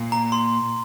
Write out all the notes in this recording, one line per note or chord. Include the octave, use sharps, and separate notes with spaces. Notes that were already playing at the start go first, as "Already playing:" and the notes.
Already playing: A#2
A#5
C6